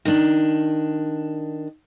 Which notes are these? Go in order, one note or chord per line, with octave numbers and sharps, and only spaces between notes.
D#3 D4